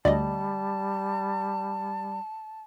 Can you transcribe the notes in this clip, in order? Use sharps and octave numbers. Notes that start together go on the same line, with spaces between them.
D2 G3 D5 D#5 A5